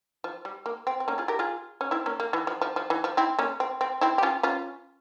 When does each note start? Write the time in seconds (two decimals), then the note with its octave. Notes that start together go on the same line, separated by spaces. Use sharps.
0.24 F3
0.45 G3
0.66 A#3
0.87 C4
1.00 C4
1.08 A#3 C#4
1.18 F4 G#4
1.28 G4 A#4
1.39 F4 G#4
1.81 C#4
1.91 C4 E4
2.06 A#3 C#4
2.20 A#3
2.33 E3
2.47 F3
2.61 F3
2.76 F3
2.90 E3
3.04 F3
3.17 C4 E4
3.39 A#3 C#4
3.60 C4
3.81 C4
4.01 C4 E4
4.18 G4
4.23 C#4 F4
4.43 C#4 F4